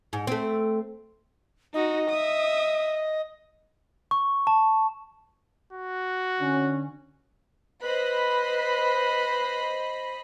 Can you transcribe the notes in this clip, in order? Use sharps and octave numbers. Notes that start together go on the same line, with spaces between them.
G#2
A3 C4
D#4 F#4 D#5
E5 D#6
C#6
A5
F#4
D3 C#4
B4 C5 D#5 B5